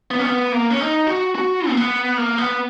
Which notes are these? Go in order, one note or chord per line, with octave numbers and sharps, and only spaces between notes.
B3
C#4
B3
A#3
C#4
D#4
F#4
F#4
A#3
B3
A#3
B3